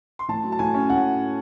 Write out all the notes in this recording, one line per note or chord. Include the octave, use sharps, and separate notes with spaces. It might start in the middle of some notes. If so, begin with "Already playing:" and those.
C6
A2 A5
F#3
A5
A2 G#5
C#4
A2 F#5